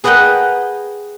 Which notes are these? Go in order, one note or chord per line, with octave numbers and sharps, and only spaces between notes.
G#4 B4 D#5 F#5 G5 A#5